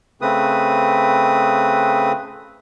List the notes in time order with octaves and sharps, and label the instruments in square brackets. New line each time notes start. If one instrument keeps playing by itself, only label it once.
[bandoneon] C#3 A3 C4 B4 D#6